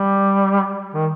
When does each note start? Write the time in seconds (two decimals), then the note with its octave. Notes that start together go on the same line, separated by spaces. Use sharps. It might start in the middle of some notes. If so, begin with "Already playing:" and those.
Already playing: G3
0.94 D#3